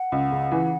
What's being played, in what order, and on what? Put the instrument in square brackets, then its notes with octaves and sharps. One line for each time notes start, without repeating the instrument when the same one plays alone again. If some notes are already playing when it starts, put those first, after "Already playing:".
Already playing: [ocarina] F#5
[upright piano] C#2
C#3
E3